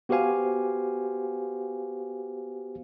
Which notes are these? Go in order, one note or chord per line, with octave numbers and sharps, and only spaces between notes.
B3 F#4 G4 C5 F5 G#5